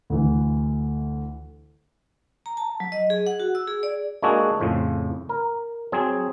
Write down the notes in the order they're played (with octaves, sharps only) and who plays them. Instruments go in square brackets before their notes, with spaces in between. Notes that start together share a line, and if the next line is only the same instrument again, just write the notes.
[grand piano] D2 E3
[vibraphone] A#5
A5
F#3
D#5
G#4
F#5
F#4
E6
G#4
D5
[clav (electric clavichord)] G#3 A#3 D4 F#4 G#4 A4
F2 A2 C#3 F3
A#4
F#3 C4 G#4